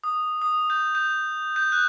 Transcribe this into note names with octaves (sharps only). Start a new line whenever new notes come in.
D#6
D#6
G6
G6
G6
F#6